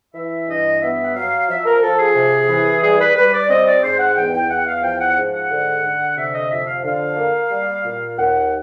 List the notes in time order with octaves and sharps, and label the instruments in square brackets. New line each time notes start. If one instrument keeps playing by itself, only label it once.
[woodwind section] E3 E5
G2 D#5
B3 E5
F#5
F#3 F5
F3 E5
A#4
F3 A4
G#4
C3
E3
G3 G#4
B4
G3 B4
D5
C4 D#5
D5
G#2 C5
F#5
E2 G5
G5
E2 F#5
F5
F3 G5
F#5
G#2
F#5
D3
D3
C3 E5
D#5
F2 E5
F5
D3 F5
A#3
G3
A#2
D#2 F#5